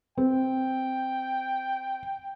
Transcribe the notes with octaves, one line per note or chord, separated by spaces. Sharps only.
C4 G5